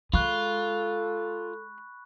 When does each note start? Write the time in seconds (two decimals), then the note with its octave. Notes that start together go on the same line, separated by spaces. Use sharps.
0.13 G#3 F4 A4 B5 C#6 F#6